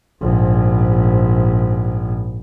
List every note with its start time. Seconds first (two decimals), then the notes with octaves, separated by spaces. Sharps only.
0.22 A#1 G#2